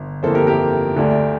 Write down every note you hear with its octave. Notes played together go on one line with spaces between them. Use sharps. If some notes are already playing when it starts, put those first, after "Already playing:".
Already playing: G1
G1 F2 E3 A#3 A4 C5
G4 A#4
G4 A#4
D2 D3 A3 D4